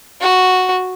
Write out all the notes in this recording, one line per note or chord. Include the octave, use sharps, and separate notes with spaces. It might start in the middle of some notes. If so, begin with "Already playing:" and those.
F#4